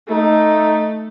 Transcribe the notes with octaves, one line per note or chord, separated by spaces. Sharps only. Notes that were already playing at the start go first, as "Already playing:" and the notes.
A3 D#4